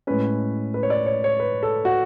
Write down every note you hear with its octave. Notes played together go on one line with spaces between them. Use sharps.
A2 G#3 C#4 B4
B4
C#5
D5
C#5
C#5
B4
A4
F#4